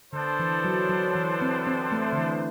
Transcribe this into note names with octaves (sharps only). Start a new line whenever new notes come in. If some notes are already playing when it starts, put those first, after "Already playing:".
D3 B3 D4 A4 C5
E3
F#3
F#3
E3
C4
C4
A3
D3
E3